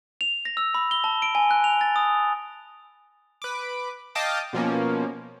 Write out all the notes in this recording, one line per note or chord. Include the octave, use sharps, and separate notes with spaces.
F7
A#6
E6
B5
G7
A5
D7
G#5
F#6
F7
A6
D#6
B4 D6
D#5 F5 G5 A5 D6 D#6
B2 F3 A#3 C#4